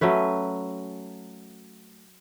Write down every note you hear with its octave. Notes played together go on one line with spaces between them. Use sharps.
F#3 A3 C#4 B4